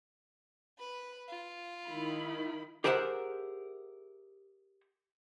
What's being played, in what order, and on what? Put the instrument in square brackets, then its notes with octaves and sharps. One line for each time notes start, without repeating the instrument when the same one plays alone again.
[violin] B4 B5
F4
[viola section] D#3 E4 B5
[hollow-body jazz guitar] G4 G#4 A#4 C5 E5 F#5